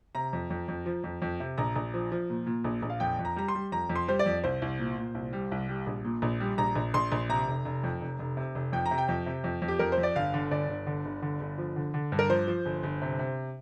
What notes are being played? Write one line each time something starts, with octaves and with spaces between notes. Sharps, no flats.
C3 A#5
F2
F2
F2
F3
F2
F2
C3
A#1 A#5
A#1
F3
F3
A#2
A#2
A#1
A#1
F5
F2 G5
F2
A#5
G3 A#5
C6
G3
F2 A#5
F2
C6
G3 C5
D5
F2
C2 C5
C2
A#2
A#2
C2
G3
C2
G3
A#1
A#2
A#1
G3
A#1 A#5
A#1
A#1 C6
A#1
C3 A#5
F1
F1
F2
F1
F1
C3
F1
F2 G5
A#5
C3
G5
F2
C3
F2
F2
G4
F2 A#4
C5
F2
D5
G1 F5
D3
G1 D5
G1
D3
G1
D3
G1
F3
D3
D3
G2
A#4
F3 C5
F3
G1
G1
C3
C3